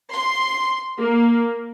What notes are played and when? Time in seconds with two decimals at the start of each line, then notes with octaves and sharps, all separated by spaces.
0.12 C6
0.99 A#3